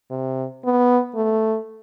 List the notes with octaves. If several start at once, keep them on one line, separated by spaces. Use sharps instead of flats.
C3
B3
A3